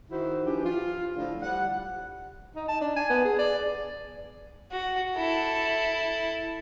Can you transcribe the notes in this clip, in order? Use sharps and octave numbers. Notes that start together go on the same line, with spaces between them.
D#3 E4 F#4 C5
E3 F3 D4 G4
F4
A2 D3 F3
G3 F#5
D#4
A5
D4
G#5
B3
G#4
D5
F#4
E4 A4